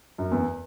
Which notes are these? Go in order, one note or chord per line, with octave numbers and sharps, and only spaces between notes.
F#2
E2